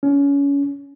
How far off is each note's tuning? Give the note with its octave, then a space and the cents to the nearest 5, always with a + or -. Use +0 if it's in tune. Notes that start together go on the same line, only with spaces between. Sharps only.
C#4 +25